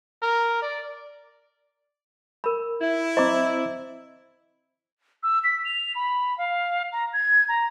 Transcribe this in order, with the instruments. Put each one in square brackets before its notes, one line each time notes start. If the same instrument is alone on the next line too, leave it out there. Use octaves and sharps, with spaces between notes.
[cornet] A#4
D5
[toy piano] A#4 B5
[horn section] E4
[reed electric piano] C4 C5 [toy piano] D#5 A#5 D6
[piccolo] E6
B6
F7
B5
F5
A#5
G#6
A#5